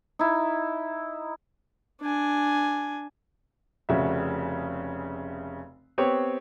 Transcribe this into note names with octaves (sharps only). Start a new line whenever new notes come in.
D#4 E4
D4 G#5
F1 C#3 F#4 E5
B3 C4 G4 C#5